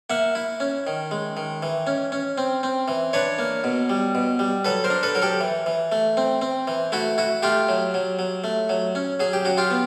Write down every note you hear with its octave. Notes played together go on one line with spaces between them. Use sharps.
A#3 E5 F#5
E4
C#4
D#3
G#3
D#3
E3
C#4
C#4
C4
C4
E3
D4 B4 C#5
A#3
B2
G3
B2
G3
F#3 A4 B4
A#4 C5
D4
A4 B4
F#3 A#4
G4 A4
E3
E3
A3
C4
C4
E3
A3 E4 F#4
E4 F#4
A3 F4 G4
F#3
F#3
F#3
A3
F#3
C#4
F#3 G#4
G4
F#3 F#4
F4 G4
B3